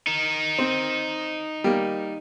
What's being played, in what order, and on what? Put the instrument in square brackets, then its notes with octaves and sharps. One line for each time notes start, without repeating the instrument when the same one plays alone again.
[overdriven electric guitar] D#4 A#4
[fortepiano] C4
G3 A#3